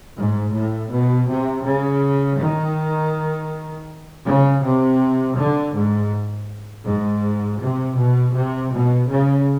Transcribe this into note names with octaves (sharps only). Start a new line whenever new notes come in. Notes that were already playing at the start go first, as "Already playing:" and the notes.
G#2
A2
B2
C3
C#3
D#3
C#3
C3
D3
G#2
G#2
C3
B2
C3
B2
C#3